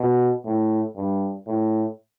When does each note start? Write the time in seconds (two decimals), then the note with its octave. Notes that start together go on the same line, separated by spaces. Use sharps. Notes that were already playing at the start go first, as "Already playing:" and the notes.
Already playing: B2
0.45 A2
0.96 G2
1.47 A2